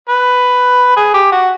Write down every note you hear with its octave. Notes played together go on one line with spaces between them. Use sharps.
B4
G#4
G4
F#4